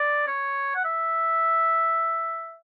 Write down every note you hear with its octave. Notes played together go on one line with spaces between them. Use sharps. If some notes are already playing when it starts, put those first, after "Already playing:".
Already playing: D5
C#5
F#5
E5